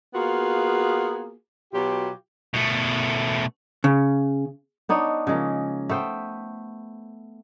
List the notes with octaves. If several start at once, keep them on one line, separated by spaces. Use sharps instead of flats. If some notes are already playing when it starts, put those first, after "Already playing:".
A#3 B3 F4 F#4 G#4
B2 F#3 F4 G4
B2 A3
C#3
B3 D4 D#4 C#5
C#3 F3 G#3 A#3
A3 B3 C5 G5